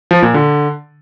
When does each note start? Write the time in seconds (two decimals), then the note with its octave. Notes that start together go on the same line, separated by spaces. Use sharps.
0.11 F3
0.22 A#2
0.34 D3